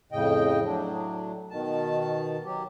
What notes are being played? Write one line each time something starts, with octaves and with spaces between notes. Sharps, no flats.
F2 A2 C#3 D#5 G5
A2 F#3 D4
B2 D#3 A5
F#3 G4